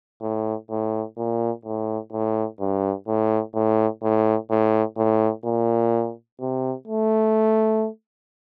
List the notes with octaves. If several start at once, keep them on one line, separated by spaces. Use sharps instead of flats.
A2
A2
A#2
A2
A2
G2
A2
A2
A2
A2
A2
A#2
C3
A3